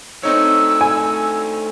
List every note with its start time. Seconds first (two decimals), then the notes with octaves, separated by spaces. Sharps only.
0.23 A3 C4 D4 D#4 C#5 E6
0.81 G#5